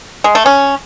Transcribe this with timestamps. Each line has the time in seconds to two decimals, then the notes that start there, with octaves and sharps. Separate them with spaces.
0.24 G#3
0.35 A3
0.46 C#4